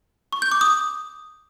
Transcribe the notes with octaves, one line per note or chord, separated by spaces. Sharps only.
C#6
G6
D6
D#6